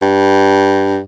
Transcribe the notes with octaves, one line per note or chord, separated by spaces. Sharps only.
G2